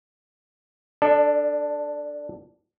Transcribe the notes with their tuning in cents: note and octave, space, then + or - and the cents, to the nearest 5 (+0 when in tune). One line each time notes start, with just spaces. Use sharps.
D4 +0 A4 +0 D5 +35